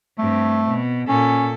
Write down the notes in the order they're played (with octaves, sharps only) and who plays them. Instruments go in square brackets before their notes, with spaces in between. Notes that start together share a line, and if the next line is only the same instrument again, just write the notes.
[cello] G2 C4 [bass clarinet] A3
[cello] B2
[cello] A#2 A4 [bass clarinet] C#4